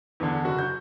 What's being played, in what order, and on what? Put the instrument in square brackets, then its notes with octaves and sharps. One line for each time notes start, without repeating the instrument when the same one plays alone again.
[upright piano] E2 D3
F#1 F#4
G6